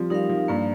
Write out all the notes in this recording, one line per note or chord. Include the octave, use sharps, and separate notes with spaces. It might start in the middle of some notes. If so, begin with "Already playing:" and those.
Already playing: F3 G3 C4
G3 D#4 A#4 F5
F3
G2 A#3